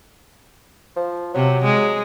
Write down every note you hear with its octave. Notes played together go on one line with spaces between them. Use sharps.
F3
C3 F#3
G#3